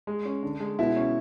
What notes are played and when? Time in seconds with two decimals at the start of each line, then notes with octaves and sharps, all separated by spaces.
0.07 G#3
0.25 C#4
0.43 D3
0.60 G#3
0.79 B2 E4
0.96 C#4